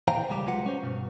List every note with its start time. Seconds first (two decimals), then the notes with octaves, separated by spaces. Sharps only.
0.08 A#2 E3 C5 F5 G5 A#5
0.30 C#2 G3 G4
0.47 C2 F#3 G#3 F4 B4 F#5
0.66 C#4 C5
0.83 G2 B2